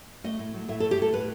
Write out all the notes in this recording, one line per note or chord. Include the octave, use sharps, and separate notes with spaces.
A3 D#5
A2
F#3
A2 E5
A4
A3
G4
A2 A4
A2 B4